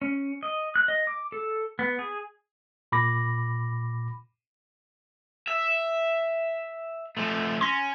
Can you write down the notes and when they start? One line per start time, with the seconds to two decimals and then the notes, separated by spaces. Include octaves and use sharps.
0.02 C#4
0.43 D#5
0.76 F#6
0.88 D#5
1.07 D6
1.32 A4
1.79 B3
1.99 G#4
2.92 A#2 B5 D6 A#6
5.47 E5
7.17 F3 A3
7.61 C#4 C6 A#6